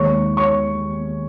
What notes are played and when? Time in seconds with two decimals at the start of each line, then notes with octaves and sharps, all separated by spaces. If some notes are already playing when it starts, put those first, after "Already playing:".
Already playing: D#2 D#3 G#3 C#5 C#6
0.37 C#5 C#6